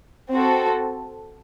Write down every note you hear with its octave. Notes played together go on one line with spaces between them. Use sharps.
C4 F#4 A4